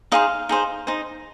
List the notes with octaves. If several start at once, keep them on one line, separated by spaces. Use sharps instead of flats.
D#4 G#4 C5 D#5 F5
D#4 G#4 C5
D#4 G#4 C5